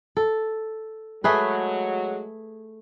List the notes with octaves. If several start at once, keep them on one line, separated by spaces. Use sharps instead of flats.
A4
F#3 G#3 A3 F#4 G#4 B4